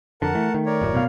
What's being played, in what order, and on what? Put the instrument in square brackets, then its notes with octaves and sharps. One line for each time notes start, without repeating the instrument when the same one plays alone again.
[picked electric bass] F2 D3 [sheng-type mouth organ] A#4 F#5 A5
[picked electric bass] E3 [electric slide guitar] A3
[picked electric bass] D#3
[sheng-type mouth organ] A#4 C#5 D5
[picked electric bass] D#1 F#2 A2
[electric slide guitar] B2 F5